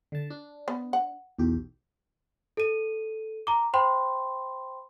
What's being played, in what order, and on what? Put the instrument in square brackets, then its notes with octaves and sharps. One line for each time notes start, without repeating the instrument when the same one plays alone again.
[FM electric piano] D3 A5
D4
[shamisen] B3
F#5
[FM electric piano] B1 E2 G4
[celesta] A4 D#7
A#5 D6
C5 G5 B5 C6